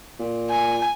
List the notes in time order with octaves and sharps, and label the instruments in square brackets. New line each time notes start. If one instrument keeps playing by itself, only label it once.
[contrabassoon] A#2
[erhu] G#5